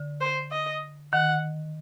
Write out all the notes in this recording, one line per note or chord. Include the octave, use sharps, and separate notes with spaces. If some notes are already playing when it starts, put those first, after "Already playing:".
Already playing: D3
C5
D#5
D#3 F#5